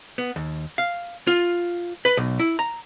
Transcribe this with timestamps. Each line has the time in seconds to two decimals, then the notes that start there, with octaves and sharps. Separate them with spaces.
0.18 B3
0.36 D#2
0.78 F5
1.27 F4
2.05 B4
2.17 B1
2.40 E4
2.59 A#5